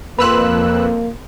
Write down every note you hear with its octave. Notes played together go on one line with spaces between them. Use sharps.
F2 A#3 B4 B5 C6 E6 F#6